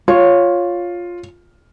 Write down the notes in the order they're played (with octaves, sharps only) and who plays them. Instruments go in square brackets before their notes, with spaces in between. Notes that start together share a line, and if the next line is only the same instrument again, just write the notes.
[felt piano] F4 [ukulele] C#5